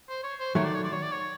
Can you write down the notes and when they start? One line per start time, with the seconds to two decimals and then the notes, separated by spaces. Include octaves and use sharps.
0.09 C5
0.24 C#5
0.40 C5
0.55 D#3 F#3 A3 C#5
0.65 D5
0.75 C#5
0.84 D5
0.93 C#5
1.02 D5
1.12 C#5